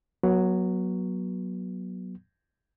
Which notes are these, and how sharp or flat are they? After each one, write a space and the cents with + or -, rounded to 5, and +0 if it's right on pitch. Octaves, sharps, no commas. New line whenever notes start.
F#3 +0 B3 -35